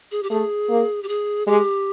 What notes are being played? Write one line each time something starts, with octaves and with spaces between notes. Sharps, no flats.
G#4
G4
A3 G#4
A#3
G4
G#4
G#3 G4